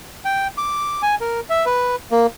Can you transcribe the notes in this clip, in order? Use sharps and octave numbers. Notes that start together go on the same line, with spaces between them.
G5
D6
G#5
A#4
E5
B4
A#3